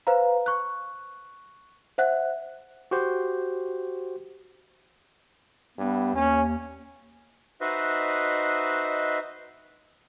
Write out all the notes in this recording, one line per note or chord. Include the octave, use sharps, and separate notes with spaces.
B4 C5 F5 A#5
C#6 F#6
C5 E5 F#5 F#6
F#4 G4 C5
G2 B3
D#2 C#4
D#4 F#4 B4 C5 D#5 E5